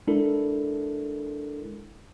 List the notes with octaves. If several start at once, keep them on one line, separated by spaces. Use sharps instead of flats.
G#3 D4 E4 A4 A#4